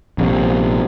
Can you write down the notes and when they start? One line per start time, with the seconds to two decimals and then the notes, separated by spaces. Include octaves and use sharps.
0.18 A#1 C3